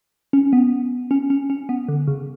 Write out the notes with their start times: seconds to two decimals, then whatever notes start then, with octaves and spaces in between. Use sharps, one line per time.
0.33 C#4
0.53 B3
1.11 C#4
1.30 C#4
1.50 C#4
1.69 B3
1.89 D3
2.07 C#3